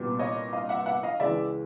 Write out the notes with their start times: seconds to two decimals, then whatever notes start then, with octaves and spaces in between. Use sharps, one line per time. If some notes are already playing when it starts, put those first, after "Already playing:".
Already playing: C2 A#2 G3 B3
0.19 C#5 D#5
0.53 D#5 F5
0.69 E5 F#5
0.86 E5 F#5
1.03 D#5 F5
1.20 C#2 C#3 E3 D5 E5